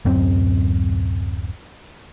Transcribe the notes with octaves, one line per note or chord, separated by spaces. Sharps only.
D1 F#2 C4